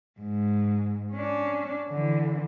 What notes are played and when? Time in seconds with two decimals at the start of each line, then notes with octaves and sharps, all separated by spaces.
0.21 G#2
1.13 C#4 D4
1.89 D3 E3